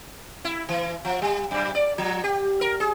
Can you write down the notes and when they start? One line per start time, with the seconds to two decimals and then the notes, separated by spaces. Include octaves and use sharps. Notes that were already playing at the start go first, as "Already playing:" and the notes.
0.45 E4
0.69 E3
1.05 F3
1.22 G3
1.51 F#2
1.75 D5
1.98 F3
2.24 G4
2.61 A#4
2.80 G#4